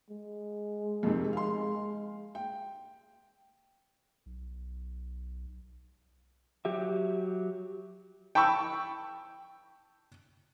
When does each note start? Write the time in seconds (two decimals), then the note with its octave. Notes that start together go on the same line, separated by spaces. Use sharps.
0.10 G#3
1.03 F2 C3 D#3
1.33 F5 C6
2.35 G5
4.26 B1
6.65 F#3 G4 E5
8.35 G5 A5 B5 C#6 E6